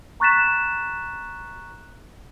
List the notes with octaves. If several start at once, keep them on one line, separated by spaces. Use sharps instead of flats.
A#5 C#6 F#6 A6 B6 E7